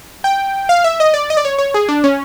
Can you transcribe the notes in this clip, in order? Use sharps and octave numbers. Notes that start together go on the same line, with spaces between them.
G5
F5
E5
D#5
D5
D#5
D5
C#5
C#5
G#4
D4
C#4